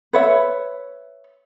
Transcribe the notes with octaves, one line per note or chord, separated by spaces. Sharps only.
B4 C#5 E5